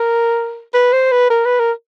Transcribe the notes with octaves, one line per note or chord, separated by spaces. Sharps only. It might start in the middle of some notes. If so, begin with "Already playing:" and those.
Already playing: A#4
B4
C5
B4
A#4
B4
A#4